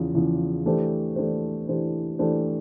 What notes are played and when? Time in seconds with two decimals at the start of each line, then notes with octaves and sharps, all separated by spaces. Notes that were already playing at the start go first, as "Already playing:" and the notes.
Already playing: E2 C#3 F3
0.14 E2 C#3 F3
0.65 E3 A3 D4 G4 C5
1.16 E3 A3 D4 G4 C5
1.67 E3 A3 D4 G4 C5
2.19 E3 A3 D4 G4 C5